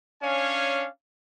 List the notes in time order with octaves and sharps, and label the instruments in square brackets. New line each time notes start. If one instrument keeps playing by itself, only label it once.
[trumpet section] C#4 D4 C#5 F5 G#5